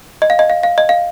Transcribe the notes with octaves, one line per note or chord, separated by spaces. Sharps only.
D#5
F5
D#5
F5
F5
D#5
F5